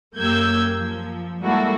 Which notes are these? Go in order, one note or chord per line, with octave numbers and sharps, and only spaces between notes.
F#2 A#3 G4 E6 G6 G#6
F3
G3 G#3 A#3 E4 F#4 A4